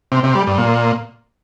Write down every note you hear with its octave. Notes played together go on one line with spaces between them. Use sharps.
C3
C3
G3
G2
A#2